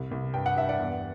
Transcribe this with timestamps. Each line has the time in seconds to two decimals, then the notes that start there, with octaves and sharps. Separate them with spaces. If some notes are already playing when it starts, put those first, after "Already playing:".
Already playing: C2
0.11 C2
0.34 G2 G5
0.46 F#5
0.56 G2 E5
0.69 D5 F#5
0.79 E2